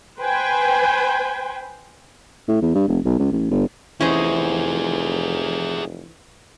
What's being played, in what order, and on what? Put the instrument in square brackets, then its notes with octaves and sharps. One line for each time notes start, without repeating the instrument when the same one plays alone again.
[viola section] B4 C5 G5 G#5
[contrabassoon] A2
E2
G2
F1
B1
C#2
A1
G1
[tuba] F1 [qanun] E3 D#5 [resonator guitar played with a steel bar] C#4 C5 [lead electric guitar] E4 G#4